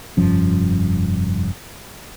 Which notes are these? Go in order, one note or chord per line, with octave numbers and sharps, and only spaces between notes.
F1 G2 F3 C#4